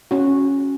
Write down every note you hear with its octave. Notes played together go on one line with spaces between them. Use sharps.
C#4 F#4